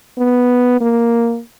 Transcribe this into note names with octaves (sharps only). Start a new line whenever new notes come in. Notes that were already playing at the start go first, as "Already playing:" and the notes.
B3
A#3